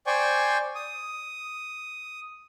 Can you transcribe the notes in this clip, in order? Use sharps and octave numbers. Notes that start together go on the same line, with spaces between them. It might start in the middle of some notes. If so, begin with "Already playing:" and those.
C5 D5 G5 G#5 C#6
D#6